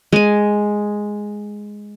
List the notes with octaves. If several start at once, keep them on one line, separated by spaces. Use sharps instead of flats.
G#3 G#5